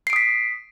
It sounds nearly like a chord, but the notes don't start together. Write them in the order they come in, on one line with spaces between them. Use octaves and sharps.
C7 D7 D#6 B6